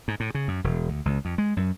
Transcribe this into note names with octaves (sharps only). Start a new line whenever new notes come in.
G#2
A2
C#3
F#2
E1
D2
C#2
F2
G#3
F#2